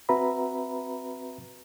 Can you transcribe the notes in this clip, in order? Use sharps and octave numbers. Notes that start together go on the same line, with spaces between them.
C4 F#4 B4 E5 A#5 B5